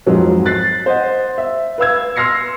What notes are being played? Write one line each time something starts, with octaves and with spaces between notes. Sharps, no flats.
F2 G#2 F3 F#3 C4
F#6 A6 B6 C7
C5 D#5 F#5
E5
B4 F5 E6 G#6
C6 E6 F6 A#6 C7 C#7